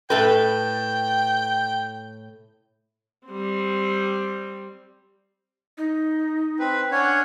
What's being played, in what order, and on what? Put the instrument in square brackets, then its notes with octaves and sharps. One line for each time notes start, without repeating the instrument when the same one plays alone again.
[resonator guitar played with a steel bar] A2 A4 B4 [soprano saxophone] G5
[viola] G3 C4
[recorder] D#4
[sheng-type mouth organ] C4 B4
[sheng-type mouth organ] C#4 D4 C#5 [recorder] F#5